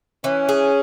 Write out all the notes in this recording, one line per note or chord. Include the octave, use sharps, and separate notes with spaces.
E3 C#4
G#4